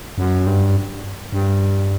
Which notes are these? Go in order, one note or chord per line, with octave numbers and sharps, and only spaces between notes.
F#2
G2
G2